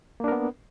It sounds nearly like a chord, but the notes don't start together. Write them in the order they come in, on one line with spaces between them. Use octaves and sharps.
A#3 D4 A#4 B3